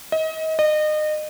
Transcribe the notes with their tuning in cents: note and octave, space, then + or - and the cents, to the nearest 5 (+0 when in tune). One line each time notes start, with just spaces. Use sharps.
D#5 +30
D#5 -30